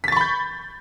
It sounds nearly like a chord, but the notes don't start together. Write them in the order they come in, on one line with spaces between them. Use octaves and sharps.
B6 A6 C#6 B5 G6